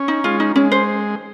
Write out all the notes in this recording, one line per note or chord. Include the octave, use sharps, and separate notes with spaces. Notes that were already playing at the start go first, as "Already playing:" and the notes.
Already playing: C#4
D#4
G#3 F4
D#4
G#3 C#4
C5